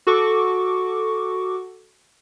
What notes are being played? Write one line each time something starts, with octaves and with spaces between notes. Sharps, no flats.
F#4 A4 C#6 D6